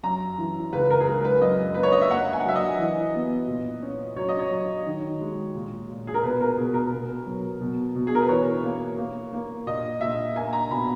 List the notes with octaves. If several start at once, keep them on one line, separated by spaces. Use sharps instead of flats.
F#2 A#5
E3
C#2 B4
A#4
G#4
G#3 A#4
B4
F#2 D#5
A#3 B4
C#5
D#5
E5
A#3 F#5
G#5
F#5
F#3 E5
D#5
E3
B3
A#2
C#4
F#3 C#5
D#5
C#5
F#3
D#3
G#3
A#2
A#2
G#4
A#4
B2 B4
A#4
B2 G#4
A#4
B2
F#3
B2
B2
G#4
A#4
B4
E3 C#5
A#3
A#3
A#3
A#2 D#5
A#2 E5
A#3 G#5
A#5
B2 B5